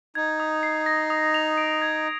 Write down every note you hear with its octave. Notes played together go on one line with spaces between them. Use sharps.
D#4 G#6
D#6
C7
A#6
D#6
F7
D7
G#6